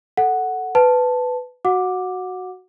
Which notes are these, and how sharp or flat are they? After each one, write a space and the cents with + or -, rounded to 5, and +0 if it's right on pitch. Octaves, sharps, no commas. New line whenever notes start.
A4 +0 F#5 +0
B4 +15 A5 +0
F#4 +0 F#5 -25 D6 +0